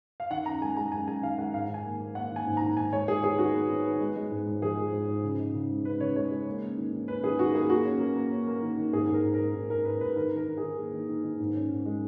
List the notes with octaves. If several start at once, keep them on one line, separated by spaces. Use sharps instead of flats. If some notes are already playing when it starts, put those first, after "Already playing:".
F5
D#3 F#5
F#2 A#5
G#3 G#5
G#3 A#5
F#2 G#5
G#3 G#5
D#3 F5
G#3 F#5
G#2 F5
D#3
G#5
A#3
A#3
A#3 F#5
D#3 G#5
G#2
A#5
D#3
G#2 G#5
G#3 C#5
G#2 G#4
B3 G#4
D#3 F#4
B3
D#3
B3
G#3
G#3
G#2
G#2
F3 G#4
G#3
G#2
G#2
C#3
D#4
C#3
G#3
C#3 B4
C#3 C#5
G#3 C#5
G#3
A#3
C#4
D#3
D#3
C#4 B4
D#3 G#4
D#3 F#4
A#3 G#4
A#3 F#4
C#4
A#3
A#3
C#4
A#3
D#3
D#3
G#2 G#4
G#2
A#4
G#2
A#4
G#2
G#2
G#2 A#4
G#2 B4
G#2 B4
D#3 A#4
D#3
A#4
D#3
G#4
D#3
A#3
D#3
D#3
D#3
G#2
C#4
G#2
G#3